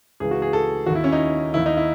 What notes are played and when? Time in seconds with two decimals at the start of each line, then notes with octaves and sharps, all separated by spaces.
0.20 C#2 C#3 E3 G#4
0.31 F#4
0.42 G#4
0.53 A4
0.86 D#2 D#3 F#4
0.95 E4
1.04 C#4
1.12 D#4
1.54 D#2 D#3 E4
1.66 D#4
1.77 E4